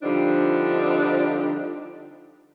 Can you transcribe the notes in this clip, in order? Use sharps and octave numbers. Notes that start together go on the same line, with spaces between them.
D3 F3 G3 C4 D4 D#4